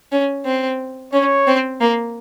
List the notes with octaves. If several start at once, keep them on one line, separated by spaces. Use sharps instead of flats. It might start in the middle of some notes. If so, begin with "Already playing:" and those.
C#4
C4
C#4 C#5
C4
A#3